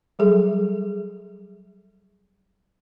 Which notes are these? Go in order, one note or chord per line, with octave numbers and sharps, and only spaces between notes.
F#3 G3 G#4 A4 E5